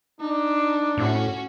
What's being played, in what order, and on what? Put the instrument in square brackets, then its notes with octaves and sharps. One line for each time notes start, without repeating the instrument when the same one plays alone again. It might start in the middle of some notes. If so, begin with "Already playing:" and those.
[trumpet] D4 [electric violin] D#4
[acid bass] A2 [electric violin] C#4 F#4